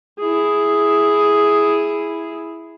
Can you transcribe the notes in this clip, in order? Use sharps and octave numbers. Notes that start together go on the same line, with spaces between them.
E4 G#4